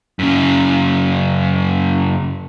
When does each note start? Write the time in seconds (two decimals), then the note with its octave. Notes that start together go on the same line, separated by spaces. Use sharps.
0.19 F#2 C#3